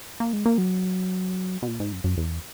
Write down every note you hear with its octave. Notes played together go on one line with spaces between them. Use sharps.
A#3
G#3
A#3
F#3
B2
A#2
G#2
F#2
F#2
E2